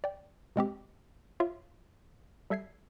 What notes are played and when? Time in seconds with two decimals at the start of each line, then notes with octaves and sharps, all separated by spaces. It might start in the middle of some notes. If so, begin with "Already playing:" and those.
0.04 D5 G5
0.56 B2 G#3 C4 G4
1.40 F4 C#5 E5 F5
2.50 G3 A4 E5 G#6 C7